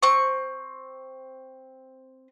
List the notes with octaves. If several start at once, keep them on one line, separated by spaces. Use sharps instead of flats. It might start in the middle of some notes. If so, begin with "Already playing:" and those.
C4 C#6